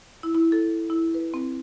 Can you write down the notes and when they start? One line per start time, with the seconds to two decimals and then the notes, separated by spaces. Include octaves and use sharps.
0.23 E4
0.35 E4
0.52 A4
0.90 E4
1.14 B4
1.34 C4